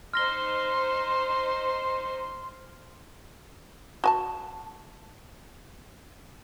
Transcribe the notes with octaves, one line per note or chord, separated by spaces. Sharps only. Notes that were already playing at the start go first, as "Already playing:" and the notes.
D#4 C5 C6 F6 A#6 G7
F#4 G#5 A5